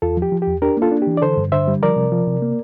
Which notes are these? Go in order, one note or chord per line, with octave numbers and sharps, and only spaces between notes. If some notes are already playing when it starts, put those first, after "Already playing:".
E2 F4 A4
F3
G4
F3
G4
E2
D4 G4 A#4
A#3 F4 A4
D4
G4
E3
D5
D3 A4 C5
G2
D3 C5 E5
G3
F3 A#4 D5
C3
F3
C3
A#3